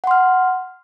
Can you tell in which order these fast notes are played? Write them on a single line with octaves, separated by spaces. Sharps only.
F#5 C6 F6